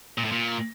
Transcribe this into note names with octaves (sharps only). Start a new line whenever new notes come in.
A#2
A2
A#2